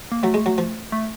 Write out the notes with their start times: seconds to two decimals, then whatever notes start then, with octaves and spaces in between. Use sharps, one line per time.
0.12 A#3
0.23 F#3 A3
0.34 G#3
0.46 F#3
0.58 F3
0.92 A3